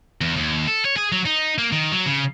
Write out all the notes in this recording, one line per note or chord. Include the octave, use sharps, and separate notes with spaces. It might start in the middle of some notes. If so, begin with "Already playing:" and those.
E2
D#2
A4
C#5
G#4
F#3
D#4
A#3
D#3
F#3
C#3